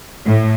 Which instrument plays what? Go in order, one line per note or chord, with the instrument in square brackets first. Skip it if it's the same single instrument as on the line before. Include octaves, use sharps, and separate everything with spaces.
[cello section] A2